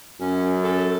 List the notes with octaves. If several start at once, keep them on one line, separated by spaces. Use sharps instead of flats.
F#2 C#4
A4